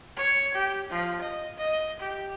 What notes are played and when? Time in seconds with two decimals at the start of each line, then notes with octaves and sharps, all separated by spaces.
0.17 C#5
0.54 G4
0.90 F3
1.21 D#5
1.58 D#5
2.00 G4